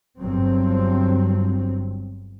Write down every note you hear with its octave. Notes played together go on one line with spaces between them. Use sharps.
G1 G2 F#3 C4